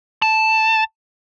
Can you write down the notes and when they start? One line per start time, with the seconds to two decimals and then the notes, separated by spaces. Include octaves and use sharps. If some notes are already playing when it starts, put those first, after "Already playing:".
0.22 A5